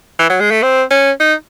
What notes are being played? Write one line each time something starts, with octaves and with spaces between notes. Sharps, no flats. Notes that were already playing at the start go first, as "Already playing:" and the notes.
E3
F#3
G#3
A3
C4
C#4
D#4